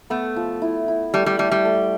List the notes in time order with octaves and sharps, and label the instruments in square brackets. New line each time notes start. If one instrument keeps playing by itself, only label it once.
[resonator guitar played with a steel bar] A3 [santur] B3
[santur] F3
E4
E4
[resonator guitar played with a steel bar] G3 [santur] A3
[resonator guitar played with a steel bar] G3
[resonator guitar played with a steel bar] G3 [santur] A3
[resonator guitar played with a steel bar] G3
[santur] A3